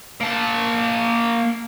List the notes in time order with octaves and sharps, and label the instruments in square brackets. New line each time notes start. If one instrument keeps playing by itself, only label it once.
[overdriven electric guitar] A#3 A5